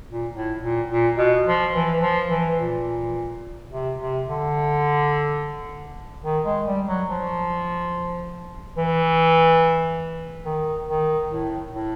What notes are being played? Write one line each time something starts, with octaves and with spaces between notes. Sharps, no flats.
A#2
A2
A#2
A#2
B2
F3
E3
F3
E3
A#2
C3
C3
D3
D#3
G#3
G3
F#3
F3
E3
D#3
D#3
A2
A2